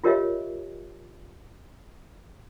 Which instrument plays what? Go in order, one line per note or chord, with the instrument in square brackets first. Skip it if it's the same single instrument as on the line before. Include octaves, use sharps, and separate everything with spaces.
[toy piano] F4 G4 A#4 C#5 D#5 E5